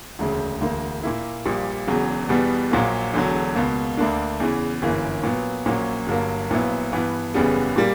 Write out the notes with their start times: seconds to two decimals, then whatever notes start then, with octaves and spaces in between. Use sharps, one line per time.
0.19 E1 D2 C#3
0.61 E1 D2 D3 A#3
1.03 A#2 A#3 E4
1.45 A#1 A#2 G3
1.87 E1 E2 C#3 F#3
2.29 E2 B2 G3 B3
2.71 A#1 A#2 F#3 A#3
3.14 E1 E2 D3 F#3
3.55 C#2 B2 A#3
3.97 D2 D3 A#3 D4
4.40 E2 C#3 E3
4.82 G1 F#2 E3 A#3
5.24 A#2 F#3 B3
5.66 A#1 A#2 F#3 A#3 C#4
6.07 G1 G2 F#3 A#3
6.50 A#1 A#2 F#3 B3 E4
6.92 G2 E3 B3
7.34 F#1 E2 C#3 G3 B3
7.76 A#2 G3 A#3